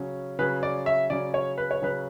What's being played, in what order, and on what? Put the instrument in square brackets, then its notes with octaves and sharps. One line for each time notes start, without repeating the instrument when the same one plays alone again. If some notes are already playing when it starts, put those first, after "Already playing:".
Already playing: [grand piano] C#3 F#3 C#4
[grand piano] C#3 F#3 C#4 [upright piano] B4
[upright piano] D5
E5
[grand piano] C#3 F#3 C#4 [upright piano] D5
[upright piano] C#5
B4
C#5
[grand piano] C#3 F#3 C#4 [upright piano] B4